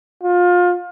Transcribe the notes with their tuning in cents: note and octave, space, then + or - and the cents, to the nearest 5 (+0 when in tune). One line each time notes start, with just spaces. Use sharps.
F4 +25